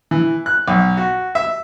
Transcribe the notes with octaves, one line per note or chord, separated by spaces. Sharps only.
E3
F#6
B1
F#4
E5